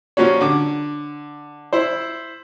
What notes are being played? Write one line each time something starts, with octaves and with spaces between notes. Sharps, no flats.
F3 A#3 C#4 F#4 C#5
D3 D6
E4 C5